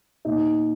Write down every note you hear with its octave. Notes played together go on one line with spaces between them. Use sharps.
A#2 D#4